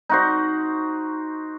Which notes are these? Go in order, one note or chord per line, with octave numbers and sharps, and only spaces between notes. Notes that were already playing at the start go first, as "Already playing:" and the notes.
D#4 F#4 C5